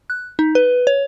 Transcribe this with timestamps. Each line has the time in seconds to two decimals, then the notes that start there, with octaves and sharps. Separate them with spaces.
0.10 F#6
0.39 D#4
0.55 B4
0.87 C#5